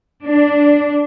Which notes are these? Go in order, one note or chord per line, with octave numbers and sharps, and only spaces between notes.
D4